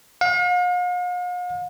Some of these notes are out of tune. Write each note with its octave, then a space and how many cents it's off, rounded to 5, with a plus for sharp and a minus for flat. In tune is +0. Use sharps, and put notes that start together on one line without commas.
F5 +45